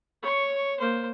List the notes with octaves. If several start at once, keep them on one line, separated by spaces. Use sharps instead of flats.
C#5 C#6
A#3 C5